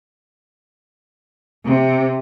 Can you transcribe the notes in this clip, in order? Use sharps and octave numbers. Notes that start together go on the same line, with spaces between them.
C3